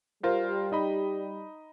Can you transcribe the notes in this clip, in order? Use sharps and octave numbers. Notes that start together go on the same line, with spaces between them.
G3 F4 A#4 C5
D#4 D#5 B5